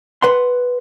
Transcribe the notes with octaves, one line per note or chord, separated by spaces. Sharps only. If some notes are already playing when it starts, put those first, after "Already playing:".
B4 F#5 C6